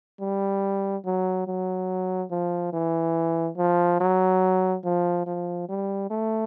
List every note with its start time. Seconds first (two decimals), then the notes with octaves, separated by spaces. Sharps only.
0.21 G3
1.05 F#3
1.48 F#3
2.31 F3
2.73 E3
3.57 F3
4.01 F#3
4.85 F3
5.27 F3
5.69 G3
6.11 A3